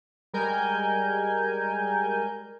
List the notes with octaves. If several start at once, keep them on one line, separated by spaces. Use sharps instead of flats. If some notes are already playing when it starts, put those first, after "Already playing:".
G3 G#3 A#4 G#5 G6